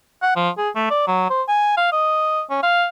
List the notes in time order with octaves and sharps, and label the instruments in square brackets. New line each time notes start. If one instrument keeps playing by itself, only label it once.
[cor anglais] F#5
F3
G#4
A3
D5
F#3
C5
G#5
F5
D#5
C#4
F5